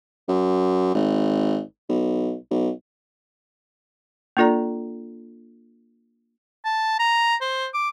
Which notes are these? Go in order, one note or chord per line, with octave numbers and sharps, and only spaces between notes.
F#2
G#1
B1
B1
A#3 D4 F4 A4 D5 A#5
A5
A#5
C5
D6